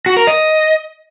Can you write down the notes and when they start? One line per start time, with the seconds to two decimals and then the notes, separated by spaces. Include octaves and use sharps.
0.06 F#4
0.17 A#4
0.27 D#5